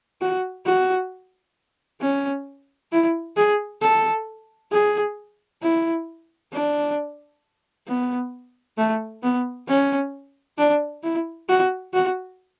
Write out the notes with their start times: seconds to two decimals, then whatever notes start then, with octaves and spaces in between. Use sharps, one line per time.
0.21 F#4
0.66 F#4
2.01 C#4
2.92 E4
3.37 G#4
3.82 A4
4.72 G#4
5.62 E4
6.53 D4
7.87 B3
8.78 A3
9.23 B3
9.68 C#4
10.58 D4
11.03 E4
11.49 F#4
11.94 F#4